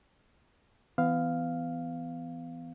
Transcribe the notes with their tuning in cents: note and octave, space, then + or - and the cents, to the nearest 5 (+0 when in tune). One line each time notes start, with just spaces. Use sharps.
E3 +0 B3 +30 F5 +0